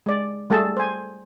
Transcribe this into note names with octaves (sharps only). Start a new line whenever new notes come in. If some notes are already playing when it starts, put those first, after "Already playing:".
G#3 D5
G3 A3 G#4 A4 A5
C5 G#5